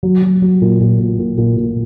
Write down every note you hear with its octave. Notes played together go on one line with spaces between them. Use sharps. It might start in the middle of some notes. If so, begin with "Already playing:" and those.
F#3
F#3
F#3
A#2
A#2
A#2
A#2
A#2
A#2